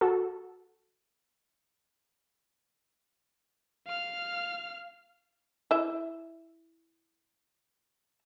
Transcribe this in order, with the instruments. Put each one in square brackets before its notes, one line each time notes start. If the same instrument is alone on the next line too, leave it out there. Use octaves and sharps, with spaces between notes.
[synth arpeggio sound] F#4 A4
[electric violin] F5 F6
[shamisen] E4 E5